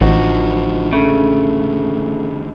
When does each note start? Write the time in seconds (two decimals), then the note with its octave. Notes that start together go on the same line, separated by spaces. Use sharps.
0.01 A1 E2 D3 F3 D#4 F#4
0.93 C#3 A3